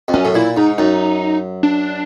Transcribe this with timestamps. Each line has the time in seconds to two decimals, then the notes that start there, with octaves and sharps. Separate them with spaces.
0.08 F2
0.14 F#2 C#4
0.25 A2
0.35 A#2 E4
0.57 G#2 D#4
0.78 F#2 D#4
1.63 D4